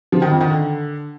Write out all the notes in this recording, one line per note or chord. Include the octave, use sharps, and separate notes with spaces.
F3
D#3
F2
D#3
D3